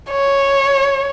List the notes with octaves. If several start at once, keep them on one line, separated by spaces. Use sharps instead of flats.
C#5